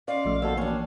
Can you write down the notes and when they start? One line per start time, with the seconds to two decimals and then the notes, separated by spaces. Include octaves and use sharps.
0.08 C#4 D5 D#5 F5 C6
0.25 A#1 F3 A3
0.42 D#2 B2 B3 A4 F#5 E6
0.57 E3 A3 A#3 C#4 D4 G5